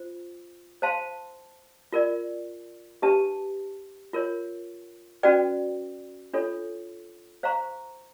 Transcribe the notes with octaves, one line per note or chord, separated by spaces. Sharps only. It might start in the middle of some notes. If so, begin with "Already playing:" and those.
Already playing: F4 C5
C5 F5 A5 C6
F4 A#4 D5
D4 G4 B4 E5 A5
F4 A#4 C#5
C#4 F#4 B4 D5 G5
D4 F4 A4 C#5
C5 F5 A#5 C#6